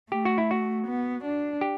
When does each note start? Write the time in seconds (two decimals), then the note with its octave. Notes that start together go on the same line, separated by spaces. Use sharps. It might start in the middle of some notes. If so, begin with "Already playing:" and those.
0.12 A3 G4
0.25 F#4
0.38 E4
0.51 F#4
0.87 B3
1.25 D4
1.61 G4